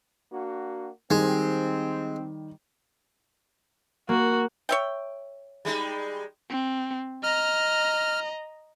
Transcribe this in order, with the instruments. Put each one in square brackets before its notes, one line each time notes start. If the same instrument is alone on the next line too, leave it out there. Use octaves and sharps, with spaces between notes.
[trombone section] A#3 D4 F#4
[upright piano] D#3 G3 [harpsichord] G#3 [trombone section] C4
[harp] A#3 [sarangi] F#4
[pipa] C#5 E5 G5
[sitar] G3 G#3 D#4
[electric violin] C4
[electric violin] D#5 A#5 [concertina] F6